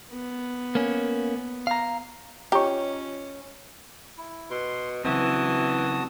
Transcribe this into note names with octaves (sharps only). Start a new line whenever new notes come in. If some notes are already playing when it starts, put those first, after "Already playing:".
B3
A#3 C#4
F5 A#5
C#4 F4 G4 C#5 D#5 A#5 C#6
E4
B2 C6
C#3 E3 F#3 C4 F#4 A5 D#6